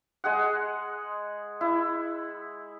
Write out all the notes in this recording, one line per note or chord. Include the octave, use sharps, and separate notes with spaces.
G#3 G#4 F#5
E4